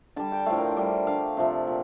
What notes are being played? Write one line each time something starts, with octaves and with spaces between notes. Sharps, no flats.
D3 G3 A5
G5
A2 F3 A3 F5
A#4
C5
D3 G3 D5
D3 A3 F5
C3 F3 A3
A#2